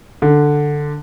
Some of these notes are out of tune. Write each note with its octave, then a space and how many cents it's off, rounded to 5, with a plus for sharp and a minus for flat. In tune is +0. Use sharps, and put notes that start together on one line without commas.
D3 +5